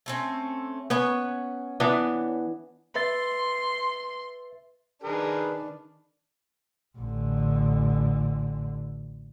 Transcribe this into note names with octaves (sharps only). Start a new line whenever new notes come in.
A3 C4 C#4
B3 C#4 B4 C#5
E3 B3 D4
B4 E5 C6 A6
D#3 D4 G#4 A#4 B4
A1 D3